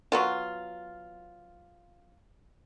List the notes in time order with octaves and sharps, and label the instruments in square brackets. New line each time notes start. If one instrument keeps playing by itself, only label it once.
[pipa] F#3 B3 F4